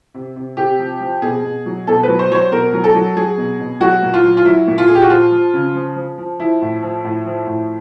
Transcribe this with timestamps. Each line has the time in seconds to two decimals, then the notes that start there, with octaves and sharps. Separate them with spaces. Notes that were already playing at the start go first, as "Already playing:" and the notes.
0.14 C3
0.36 C3
0.57 C3 G4
0.79 F3
1.01 F3
1.22 B2 G#4
1.44 B2
1.66 F#3
1.87 B2 A4
2.03 F#3 B4
2.19 C5
2.30 F#3 C#5
2.35 C5
2.51 B2 A#4
2.73 F#3
2.84 A4
2.95 F#3
3.16 F#3 G#4
3.38 B2
3.60 B2
3.80 F#3 F#4
4.02 A#2
4.14 F4
4.23 F#3
4.37 F4
4.45 F#3 E4
4.67 A#2
4.78 F4
4.88 A#2 G#4
4.95 G4
5.02 F#4
5.10 F3 F4
5.32 F3
5.53 C#3
5.75 F3
5.96 F3
6.18 F3
6.39 F3 E4
6.62 A2
6.82 F3
7.04 A2
7.26 F3
7.47 A2